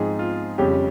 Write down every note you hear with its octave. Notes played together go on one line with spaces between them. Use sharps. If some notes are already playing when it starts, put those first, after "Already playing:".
Already playing: G#2 F3 C4 D#4 G#4
F4
F2 C#3 G3 C#4 G4